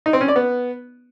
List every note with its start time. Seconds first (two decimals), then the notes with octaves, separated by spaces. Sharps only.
0.06 D#4
0.13 C4
0.21 C#4
0.28 D5
0.36 B3